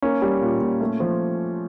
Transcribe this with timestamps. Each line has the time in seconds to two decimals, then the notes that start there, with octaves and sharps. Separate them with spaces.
0.02 A#3 C#4
0.22 G3
0.41 A#2
0.61 A#2
0.80 A3
1.00 F3